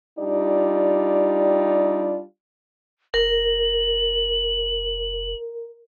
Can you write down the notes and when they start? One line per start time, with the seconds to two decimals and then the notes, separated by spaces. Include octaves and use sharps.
0.19 G3 D4 D#4 F4 G4 D5
3.14 F1 A#4 F#7